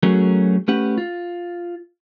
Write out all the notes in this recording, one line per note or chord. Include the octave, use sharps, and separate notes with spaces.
F#3 A3 C#4 F#4 G#4 A#4
A3 C#4 G4 B4 F#5
F4